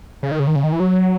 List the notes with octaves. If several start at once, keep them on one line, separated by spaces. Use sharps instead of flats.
C#3
D#3
C#3
D#3
C#3
D#3
E3
F#3